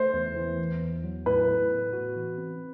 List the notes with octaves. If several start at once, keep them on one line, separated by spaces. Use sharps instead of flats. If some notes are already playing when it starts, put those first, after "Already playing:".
Already playing: A3 C5
E2
E3
E2
E2
F#3
A2 B4
A2
B3
F#4
E3
C4